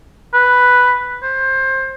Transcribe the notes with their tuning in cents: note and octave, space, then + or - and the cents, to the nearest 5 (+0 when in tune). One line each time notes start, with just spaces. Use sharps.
B4 +0
C5 +25